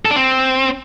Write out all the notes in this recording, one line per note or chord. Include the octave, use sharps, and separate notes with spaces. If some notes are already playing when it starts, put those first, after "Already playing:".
A4
D4
C4